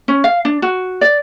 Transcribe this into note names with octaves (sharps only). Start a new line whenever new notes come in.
C#4
F5
D4
F#4
D5